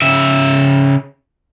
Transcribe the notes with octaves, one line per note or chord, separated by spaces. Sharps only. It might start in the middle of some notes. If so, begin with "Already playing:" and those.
C#3 E5